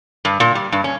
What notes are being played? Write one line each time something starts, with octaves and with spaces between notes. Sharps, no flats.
G2
A#2
G3
G2
C#4